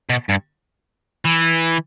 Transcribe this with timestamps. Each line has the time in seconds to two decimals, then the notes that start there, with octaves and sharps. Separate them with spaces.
0.10 B2
0.29 G2
1.25 E3